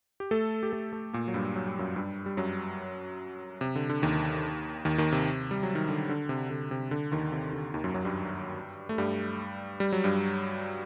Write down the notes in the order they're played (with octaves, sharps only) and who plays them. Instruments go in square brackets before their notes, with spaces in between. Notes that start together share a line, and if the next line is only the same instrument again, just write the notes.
[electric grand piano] G4
A3 A4
G4
A3 A4
A3 A4
A#2 A#3
F#3
G2 G3
F#3
G3
F#2 F#3
G2 G3
G3
F#2 F#3
C3
D3
D3
D#2 D#3
D#2 D#3
D#2 D#3
C3
G3
F#3
D#3
D3
D3
C3
D3
C3
D3
D#2 D#3
C3
D3
D#2 D#3
F#2 F#3
F#2 F#3
G2 G3
A3
G2 G3
G3
F#3
G2 G3